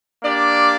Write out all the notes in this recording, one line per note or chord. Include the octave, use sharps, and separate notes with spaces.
A#3 D4 G4 D5